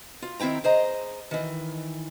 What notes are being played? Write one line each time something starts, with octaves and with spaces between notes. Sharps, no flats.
F4
D#3 C4 E4 G5 A#5
G#4 C5 D#5 A#5
D#3 E3